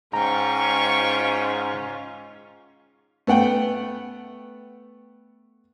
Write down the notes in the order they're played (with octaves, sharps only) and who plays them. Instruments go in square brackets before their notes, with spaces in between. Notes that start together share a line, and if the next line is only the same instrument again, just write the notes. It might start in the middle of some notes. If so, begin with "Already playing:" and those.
[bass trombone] G#2 [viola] C#4 F4 [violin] G5 C#6 [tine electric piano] A#5
[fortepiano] A3 B3 F#5 G5